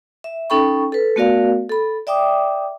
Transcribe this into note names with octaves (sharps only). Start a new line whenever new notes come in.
E5
C#4 D#4 A4 G5 B5 C#6
A4 B4
A3 B3 F#4 A#4 D5 F5
A4 B5
D5 E5 G5 D6 D#6